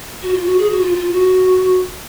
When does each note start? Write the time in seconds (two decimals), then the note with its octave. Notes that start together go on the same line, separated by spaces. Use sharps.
0.23 F#4
0.34 F4
0.46 F#4
0.59 G#4
0.70 F#4
0.81 F4
0.94 F4
1.12 F#4